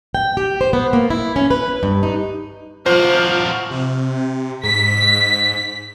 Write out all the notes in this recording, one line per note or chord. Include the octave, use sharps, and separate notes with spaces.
G5
G4
C5
B3
A#3
E4
C#4
B4
G2
D#4
F3 F4 F#4 C5 D6 F6
C3
G#2 B6